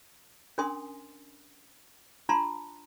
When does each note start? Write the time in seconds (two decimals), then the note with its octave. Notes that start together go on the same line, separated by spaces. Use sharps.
0.58 C#4 D4 A#4 G#5 C6 D#6
2.29 D4 F4 A5 A#5 C6